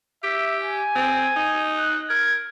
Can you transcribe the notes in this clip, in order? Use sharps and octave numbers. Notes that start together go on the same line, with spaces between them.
G4 E5
G#5
C4
D#4
F#6
A#4 G#6